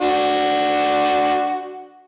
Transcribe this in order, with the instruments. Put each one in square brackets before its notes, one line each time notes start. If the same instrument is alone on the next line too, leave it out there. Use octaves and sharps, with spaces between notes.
[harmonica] D4 F#4